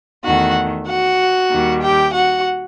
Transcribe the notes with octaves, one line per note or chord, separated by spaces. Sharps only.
E2 D#3 A3 F#4 F#5
F#4 F#5
D#2 D#3 G3
G4 G5
F#4 F#5